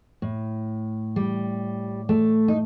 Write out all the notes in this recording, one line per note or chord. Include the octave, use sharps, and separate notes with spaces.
A2
G3
A3
D#4